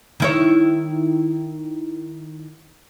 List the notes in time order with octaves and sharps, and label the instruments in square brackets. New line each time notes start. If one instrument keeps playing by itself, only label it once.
[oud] D#3 E4 C#5